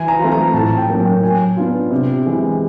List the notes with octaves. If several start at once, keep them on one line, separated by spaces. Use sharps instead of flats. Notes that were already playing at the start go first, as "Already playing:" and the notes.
Already playing: E3 G#5
A#5
A3 C4 F4
A#5
A2 A5
G5
F#3 A#3 C#4
G5
F#3 G#5
B3 D4 F4
C3
E3 G#3